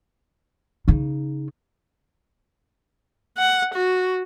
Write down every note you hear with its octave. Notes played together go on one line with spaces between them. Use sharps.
C#3 D#4
F#5
F#4